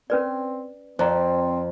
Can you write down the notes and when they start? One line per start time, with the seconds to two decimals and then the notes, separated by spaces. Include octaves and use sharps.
0.10 C4 C#4 B4 D5
0.99 F2 C4 C5 D5 A#5